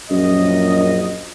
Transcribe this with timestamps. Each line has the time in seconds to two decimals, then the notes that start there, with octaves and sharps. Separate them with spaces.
0.11 A#1 F#2 D#5